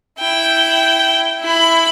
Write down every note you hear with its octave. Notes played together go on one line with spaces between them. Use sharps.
E4 G5
E4 B5